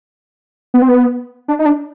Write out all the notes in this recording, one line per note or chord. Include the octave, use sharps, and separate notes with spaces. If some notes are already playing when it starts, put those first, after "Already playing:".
B3
C4
B3
D4
D#4
D4